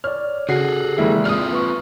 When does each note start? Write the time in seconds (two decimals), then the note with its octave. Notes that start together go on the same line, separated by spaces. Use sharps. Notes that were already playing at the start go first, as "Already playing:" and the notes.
0.04 C#5 D5 F6
0.49 C#3 F#4 G#4 A4 C7
0.98 F1 E3 G#3 A#3 E4
1.25 C4 F4 D5 D#6 F6
1.53 B4 C#6